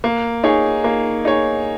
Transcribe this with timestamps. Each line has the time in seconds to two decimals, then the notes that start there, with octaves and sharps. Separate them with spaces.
0.04 A#3
0.44 D#4 G#4 C#5
0.84 A#3
1.25 D#4 G#4 C#5